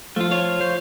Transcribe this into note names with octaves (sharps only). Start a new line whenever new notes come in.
F3 A3 F4
F4 C#5
C5